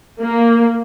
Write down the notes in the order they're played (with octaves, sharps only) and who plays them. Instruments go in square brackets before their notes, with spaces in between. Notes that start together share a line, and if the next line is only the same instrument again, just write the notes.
[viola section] A#3